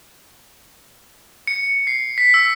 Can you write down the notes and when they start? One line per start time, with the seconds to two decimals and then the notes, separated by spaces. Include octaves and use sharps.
1.47 C#7
1.87 C7
2.18 B6
2.34 E6